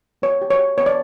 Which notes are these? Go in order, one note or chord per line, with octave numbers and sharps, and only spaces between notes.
B3 C#5
G4
C#5
G4
B3 C#5
D5